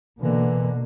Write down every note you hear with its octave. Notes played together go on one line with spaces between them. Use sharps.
B2 D3 E3 A#3